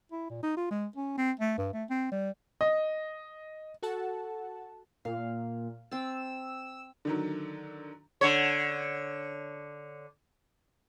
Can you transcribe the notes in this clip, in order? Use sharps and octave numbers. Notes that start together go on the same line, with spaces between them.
E4
A#2
D#4
F4
G#3
C#4
C4
A3
G2
A3
C4
G3
D#5
F#4 A4 F#5 A5
A#2 F5
C4 A5 E6
D3 D#3 F#3
D3 C#5